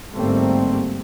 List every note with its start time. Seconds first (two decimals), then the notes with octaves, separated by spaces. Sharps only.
0.13 G1 G#2 G3 A3 A#3 C4